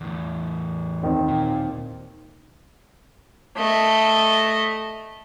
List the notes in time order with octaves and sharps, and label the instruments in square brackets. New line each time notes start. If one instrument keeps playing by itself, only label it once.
[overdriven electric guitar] E2 A2
[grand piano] D#2 D#3 C4
[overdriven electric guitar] A#2
[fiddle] A3 D#5